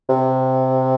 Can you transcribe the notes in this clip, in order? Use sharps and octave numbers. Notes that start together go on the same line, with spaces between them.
C3